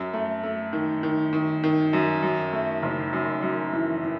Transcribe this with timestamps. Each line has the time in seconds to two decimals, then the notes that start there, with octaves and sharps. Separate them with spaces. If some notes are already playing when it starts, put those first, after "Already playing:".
Already playing: F#2
0.13 A3
0.43 A3
0.73 D#3
1.03 D#3
1.33 D#3
1.64 D#3
1.93 F#2
2.23 F#2
2.53 A3
2.83 F#1
3.13 F#2
3.43 F#2
3.73 E3
4.03 E3